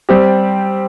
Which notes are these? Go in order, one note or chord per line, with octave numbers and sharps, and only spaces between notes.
G3 C4 G4